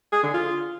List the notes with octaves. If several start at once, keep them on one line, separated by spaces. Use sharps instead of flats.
G#4
D3
F4